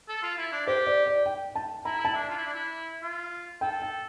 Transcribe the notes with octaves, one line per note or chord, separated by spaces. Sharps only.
A4
F4
E4
D4
G4 C5
D5
D5
G5
A5
E4 A#5
E4 A5
D4
F4
E4
D4
E4
F4
A4 G5
G5